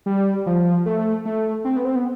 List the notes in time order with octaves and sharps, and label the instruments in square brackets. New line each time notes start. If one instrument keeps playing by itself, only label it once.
[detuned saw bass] G3
F3
A3
A3
C4
B3
C4
B3